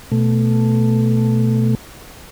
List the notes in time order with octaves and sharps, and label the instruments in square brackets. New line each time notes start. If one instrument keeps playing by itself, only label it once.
[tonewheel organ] B2 A3